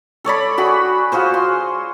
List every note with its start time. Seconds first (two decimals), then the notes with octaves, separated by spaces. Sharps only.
0.24 A4 C#5 D5 B5
0.58 F#4 G#4 B5
1.12 F4 F#4 G#4 C5
1.34 C6